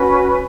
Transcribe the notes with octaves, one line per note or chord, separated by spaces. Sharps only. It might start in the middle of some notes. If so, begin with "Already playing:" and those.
Already playing: C#4 F#4 B4